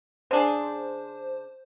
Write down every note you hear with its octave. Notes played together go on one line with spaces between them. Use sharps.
C#3 D4 G#4 C5